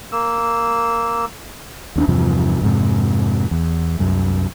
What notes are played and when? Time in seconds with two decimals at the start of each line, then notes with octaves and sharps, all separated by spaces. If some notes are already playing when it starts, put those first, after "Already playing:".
0.12 A#3 E6
1.96 D#2 C#4 D4
2.08 E2 G2 C3 F3
2.61 F2 G#2 C3
3.51 E2
3.99 C2 F#2